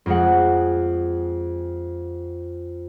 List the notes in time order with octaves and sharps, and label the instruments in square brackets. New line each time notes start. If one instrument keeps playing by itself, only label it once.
[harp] F2 G#3 F#5